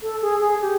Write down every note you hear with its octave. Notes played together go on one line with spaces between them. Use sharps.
A4
G#4
G#4
G4